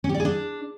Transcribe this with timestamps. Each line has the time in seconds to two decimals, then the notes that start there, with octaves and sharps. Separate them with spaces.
0.04 C#4
0.09 G4
0.14 D5
0.20 G#4
0.25 D4